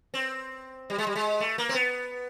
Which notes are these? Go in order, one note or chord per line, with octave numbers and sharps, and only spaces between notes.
C4
G3
G#3
G3
G#3
A3
A#3
C4
B3